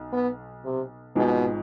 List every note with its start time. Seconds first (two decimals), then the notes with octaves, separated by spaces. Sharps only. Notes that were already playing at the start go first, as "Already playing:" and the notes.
Already playing: B1
0.12 B3
0.65 C3
1.16 G#1 G#2 B2 F3 G#3